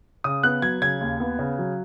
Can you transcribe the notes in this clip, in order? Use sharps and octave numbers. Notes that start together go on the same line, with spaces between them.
C#3 D#6
B3 F#6
F#3 G#6
C#3 G#6
D#2
B3
C#3
F#3